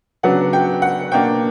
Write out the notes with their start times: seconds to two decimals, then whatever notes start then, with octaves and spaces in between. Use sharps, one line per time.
0.23 C#3 F#3 B3 D4 F#5
0.53 G5
0.82 F#5
1.12 B2 A#3 D4 G5